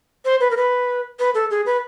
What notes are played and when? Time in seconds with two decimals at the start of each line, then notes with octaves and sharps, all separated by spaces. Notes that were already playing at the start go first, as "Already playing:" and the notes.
0.25 C5
0.40 B4
0.51 A#4
0.57 B4
1.19 B4
1.35 A4
1.51 G#4
1.66 B4